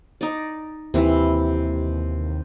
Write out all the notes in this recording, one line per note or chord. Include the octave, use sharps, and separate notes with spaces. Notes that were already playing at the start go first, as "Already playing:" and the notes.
D#4 D5
D#2 C3 E3